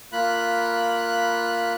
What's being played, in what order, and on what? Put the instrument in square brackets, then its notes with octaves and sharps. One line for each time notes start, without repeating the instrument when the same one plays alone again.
[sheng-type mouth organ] A#3 F4 B5 F#6